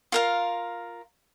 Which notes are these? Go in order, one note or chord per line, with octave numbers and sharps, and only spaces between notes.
F4 A#4 F5